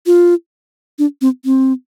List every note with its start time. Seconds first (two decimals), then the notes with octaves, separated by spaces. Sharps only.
0.06 F4
0.99 D4
1.21 C4
1.45 C4